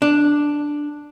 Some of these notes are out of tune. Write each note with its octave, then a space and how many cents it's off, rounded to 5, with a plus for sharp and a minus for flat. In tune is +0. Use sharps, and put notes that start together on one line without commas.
D4 +0